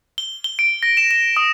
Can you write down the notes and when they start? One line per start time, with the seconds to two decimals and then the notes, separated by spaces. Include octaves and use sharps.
0.18 G7
0.44 G7
0.59 D7
0.83 A#6
0.97 E7
1.11 E7
1.37 D#6